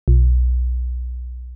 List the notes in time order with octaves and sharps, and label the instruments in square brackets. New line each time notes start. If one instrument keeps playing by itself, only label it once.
[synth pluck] B1